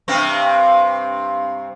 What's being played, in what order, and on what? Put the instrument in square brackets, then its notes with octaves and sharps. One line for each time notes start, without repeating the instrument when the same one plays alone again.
[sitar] G2 C3 C4